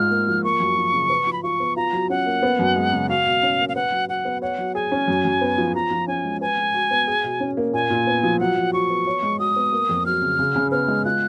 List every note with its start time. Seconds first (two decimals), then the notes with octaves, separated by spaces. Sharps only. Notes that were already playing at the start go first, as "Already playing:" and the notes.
Already playing: G#2 F4 F6
0.10 A#3
0.27 F3
0.44 A#3 C#6
0.60 F#2
0.77 F3
0.93 C#3
1.10 B4
1.27 F3
1.33 B5
1.43 F4 C#6
1.60 B3
1.76 F4 A#5
1.93 F#3
2.10 C#4 F#5
2.26 A#3
2.43 B3
2.59 F#2
2.76 G#3
2.93 C#3
3.09 F#4 F5
3.26 B2
3.43 C#4
3.59 A#3
3.69 F5
3.76 B4 F#5
3.92 F#3
4.09 F#4 F#5
4.25 B3
4.42 C#5 F#5
4.58 F#3
4.75 G#4 G#5
4.92 C#4
5.08 F#2
5.25 F#2
5.41 B3
5.58 F3
5.74 F3 A#5
5.91 F3
6.08 C#4 G#5
6.24 G#3
6.41 B4 G#5
6.57 G#3
6.74 F#4
6.91 B3
7.07 G#4
7.24 B2
7.40 C#4
7.57 A#3
7.73 A#2 G#5
7.90 A#2
8.07 B3
8.23 F3
8.39 F#3 F#5
8.56 F#3
8.73 F#4 C#6
8.90 B3
9.07 C#5
9.23 G#3
9.39 F#4 D#6
9.56 B3
9.73 A#3
9.89 F2
10.05 F#3 F6
10.22 C#3
10.39 C#3
10.56 C#3
10.72 B3 F6
10.88 G#3
11.05 F4 F#6